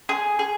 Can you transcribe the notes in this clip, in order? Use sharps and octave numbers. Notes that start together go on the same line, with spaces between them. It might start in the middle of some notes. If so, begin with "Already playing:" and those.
G#4
G#4